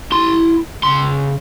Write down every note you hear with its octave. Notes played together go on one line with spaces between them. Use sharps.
E4 C6
C#3 C6